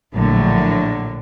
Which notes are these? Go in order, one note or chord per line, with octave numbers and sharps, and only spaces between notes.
A#1 A2 D3 F#3